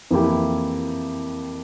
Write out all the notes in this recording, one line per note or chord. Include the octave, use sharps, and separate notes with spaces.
F2 E3 A#3 E4 G4